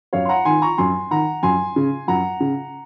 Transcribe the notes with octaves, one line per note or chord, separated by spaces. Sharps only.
F#2 C#5 F5
C6
F#5 A#5
D#3 G#5 C6
A#5 C#6
F#2 G#5 C6
D#3 F#5 A#5
F#2 G#5 C6
C#3
F#2 F#5 A#5
C#3